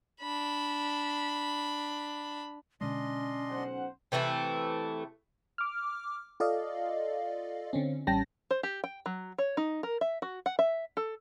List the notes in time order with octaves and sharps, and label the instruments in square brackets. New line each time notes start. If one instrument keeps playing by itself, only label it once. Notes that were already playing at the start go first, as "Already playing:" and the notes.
[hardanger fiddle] D4 B5
[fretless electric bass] B2 D3 G#3 [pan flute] C#4 [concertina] D4 D#5 C6
[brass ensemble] B1 C5 F#5
[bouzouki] C3 E3 A3 E4
[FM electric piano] D6 F6
F4 A4 D5 D#5 F5
D3 C4 C#4
A1 G3 C#4 G5 A5 A#6
[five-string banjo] C5
G4
G5
F#3
C#5
D#4
A#4
E5
F#4
F#5
E5
A4